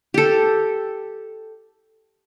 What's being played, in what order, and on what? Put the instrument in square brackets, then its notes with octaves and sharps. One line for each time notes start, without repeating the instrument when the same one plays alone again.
[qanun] G4 A4